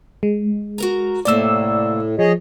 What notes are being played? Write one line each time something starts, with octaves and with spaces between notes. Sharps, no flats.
G#3
F#4 A#4 A#5
A2 C3 A3 A#3 D5 E6
F3 G#4 C#5 D#5